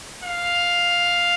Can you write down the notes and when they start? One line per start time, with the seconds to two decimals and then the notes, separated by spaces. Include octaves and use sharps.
0.23 F5